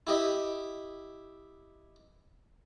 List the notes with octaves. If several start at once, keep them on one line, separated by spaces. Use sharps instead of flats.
E4 G4 D#5